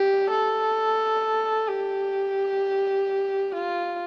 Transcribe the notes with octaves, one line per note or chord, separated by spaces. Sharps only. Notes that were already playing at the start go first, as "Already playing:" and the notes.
Already playing: G4
A4
G4
F4